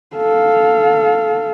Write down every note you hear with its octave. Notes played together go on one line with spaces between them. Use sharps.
A4 F5